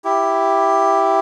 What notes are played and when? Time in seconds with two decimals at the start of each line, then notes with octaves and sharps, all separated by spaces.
0.04 E4 G4